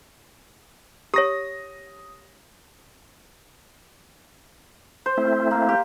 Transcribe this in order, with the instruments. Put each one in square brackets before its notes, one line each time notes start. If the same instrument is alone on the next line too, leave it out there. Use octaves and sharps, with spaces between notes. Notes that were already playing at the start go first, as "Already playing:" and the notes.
[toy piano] G4 C#5 [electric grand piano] D#6 A#6
[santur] C5
[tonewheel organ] A3 C4 E4
[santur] A#3
G4